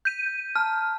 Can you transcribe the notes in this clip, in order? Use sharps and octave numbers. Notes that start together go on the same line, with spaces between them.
G6 B6 D#7
A5 A#5 F6 G6